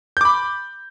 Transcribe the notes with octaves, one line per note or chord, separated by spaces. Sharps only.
B5 D6 G6